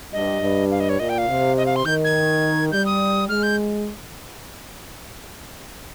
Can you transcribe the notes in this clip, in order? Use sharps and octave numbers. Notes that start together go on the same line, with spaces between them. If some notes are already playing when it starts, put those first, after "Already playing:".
G2 D#5
G2
F5
D#5
C#5
A#2 D#5
G5
F5
C3
D#5
F5
C6
D#3 G6
G#6
G3 G6
D#6
G#3 F6
G6